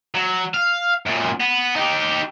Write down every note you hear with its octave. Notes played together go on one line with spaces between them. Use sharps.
F#3
F5
F#2 A#2
B3
D#4 G4